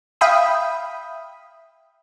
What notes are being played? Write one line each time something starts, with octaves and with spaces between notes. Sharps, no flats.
E5 F5 G5 B5 D#6